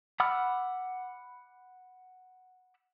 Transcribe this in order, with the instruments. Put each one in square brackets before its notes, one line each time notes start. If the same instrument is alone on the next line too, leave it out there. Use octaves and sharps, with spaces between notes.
[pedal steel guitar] F#5 B5 D6 E6 F6